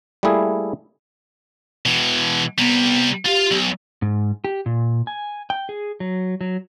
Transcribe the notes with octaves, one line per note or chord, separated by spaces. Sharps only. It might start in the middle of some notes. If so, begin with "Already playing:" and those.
G3 A3 A#3 E4 G#4
B2 E3
C3 G3 B3
F4 G4 F5
B1
G#2
G4
A#2
G#5
G5
G#4
F#3
F#3